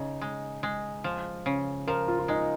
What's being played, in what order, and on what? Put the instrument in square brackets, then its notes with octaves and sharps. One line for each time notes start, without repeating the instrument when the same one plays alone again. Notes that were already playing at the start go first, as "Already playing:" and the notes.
Already playing: [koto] C#3 [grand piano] D#4
[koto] G#3
G#3
F3
C#3
[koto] F3 [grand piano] A#4
[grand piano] F4
F4
[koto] G#3 [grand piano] D#4